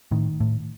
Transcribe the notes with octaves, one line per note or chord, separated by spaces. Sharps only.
A2 D#3
A2